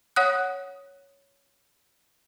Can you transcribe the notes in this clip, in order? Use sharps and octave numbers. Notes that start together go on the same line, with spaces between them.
C#5 F#5 D#6 F#6